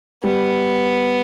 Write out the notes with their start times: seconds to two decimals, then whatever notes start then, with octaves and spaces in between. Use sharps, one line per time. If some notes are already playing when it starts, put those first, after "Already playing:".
0.23 G3 B3